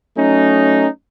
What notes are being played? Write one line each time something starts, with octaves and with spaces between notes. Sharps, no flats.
F#3 A3 C#4 D#4